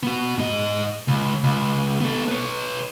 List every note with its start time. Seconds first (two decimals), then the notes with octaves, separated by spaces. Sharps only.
0.03 B3 F#4
0.38 G#2 D#5
1.08 C#2
1.44 C#2
2.01 B3 A4
2.28 B4 C#5